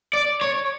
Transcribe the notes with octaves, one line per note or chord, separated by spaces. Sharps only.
D5
C#5